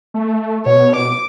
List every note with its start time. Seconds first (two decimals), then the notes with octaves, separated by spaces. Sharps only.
0.14 A3
0.66 B2 C#5
0.96 D6